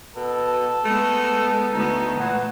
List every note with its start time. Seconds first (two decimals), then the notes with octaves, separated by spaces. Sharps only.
0.16 B2 A4
0.85 G#3 A3 B3
1.73 D2 B3 D#4
2.19 A#2 E3 A3 F#5